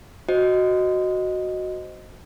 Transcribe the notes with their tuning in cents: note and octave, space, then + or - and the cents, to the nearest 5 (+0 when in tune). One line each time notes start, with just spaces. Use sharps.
F#4 +0 C5 +0 D#5 -5